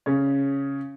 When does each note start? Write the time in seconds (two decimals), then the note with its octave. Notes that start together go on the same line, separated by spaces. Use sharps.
0.06 C#3 C#4